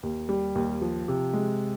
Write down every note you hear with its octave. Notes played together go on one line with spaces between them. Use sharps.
D#2
G3
D#2
F3
C3
G#3